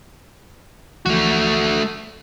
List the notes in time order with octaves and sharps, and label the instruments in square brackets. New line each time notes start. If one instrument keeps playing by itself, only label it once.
[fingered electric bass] C#2 E3 F3 [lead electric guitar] A3 F#4